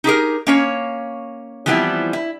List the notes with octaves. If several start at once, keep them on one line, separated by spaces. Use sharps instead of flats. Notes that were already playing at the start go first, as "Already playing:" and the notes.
D#4 G4 G#4 A#4
A#3 C#4 C#5
E3 F3 G3 B3 C4 E4
E4